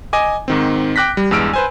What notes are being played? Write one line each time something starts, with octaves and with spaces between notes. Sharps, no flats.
D#5 G#5 D6
G#2 D#3 C4
G5 D6 F#6 A#6 B6
G3
E2 G2 G#3 E6 F6 D7
B4 C5 G#5